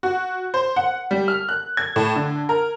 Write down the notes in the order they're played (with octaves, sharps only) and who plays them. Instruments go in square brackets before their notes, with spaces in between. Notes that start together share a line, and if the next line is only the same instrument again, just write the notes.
[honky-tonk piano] F#4
C5
F#5
G3
F6
F#6
G#6
A2
D3
A#4